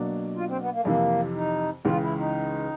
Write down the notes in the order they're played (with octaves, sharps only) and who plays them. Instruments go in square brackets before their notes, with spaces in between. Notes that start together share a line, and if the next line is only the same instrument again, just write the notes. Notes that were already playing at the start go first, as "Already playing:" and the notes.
Already playing: [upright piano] B2 F#3 A#3 D4
[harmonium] F4
C4
B3
A#3
A3
[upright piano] F2 C3 E3 [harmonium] A#3
[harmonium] D#4
[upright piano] C#2 C#3 E3 [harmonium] F4
[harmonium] E4
D#4